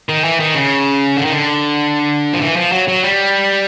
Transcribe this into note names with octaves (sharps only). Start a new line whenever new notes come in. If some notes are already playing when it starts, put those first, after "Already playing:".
D#3
E3
D#3
C#3
D3
D#3
D3
F3
E3
F3
F#3
F#3
G3